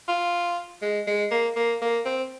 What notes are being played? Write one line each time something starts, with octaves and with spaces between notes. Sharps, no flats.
F4
G#3
G#3
A#3
A#3
A#3
C4